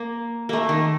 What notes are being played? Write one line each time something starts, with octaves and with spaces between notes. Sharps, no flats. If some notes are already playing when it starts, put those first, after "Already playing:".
Already playing: A#3
A3 A#3
D#3